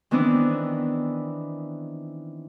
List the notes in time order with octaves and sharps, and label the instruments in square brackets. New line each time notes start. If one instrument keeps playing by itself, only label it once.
[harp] D#3 E3 B3 C4 D4 E4